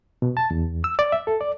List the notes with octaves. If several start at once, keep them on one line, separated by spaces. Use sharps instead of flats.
B2
A5
E2
E6
D5
E5
A4
D5